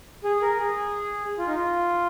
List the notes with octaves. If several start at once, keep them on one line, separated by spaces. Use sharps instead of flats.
G#4
A#4
G#4
F4
D#4
F4